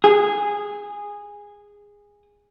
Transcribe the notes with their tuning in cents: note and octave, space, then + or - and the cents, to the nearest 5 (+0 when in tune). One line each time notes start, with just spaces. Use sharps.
G#4 -15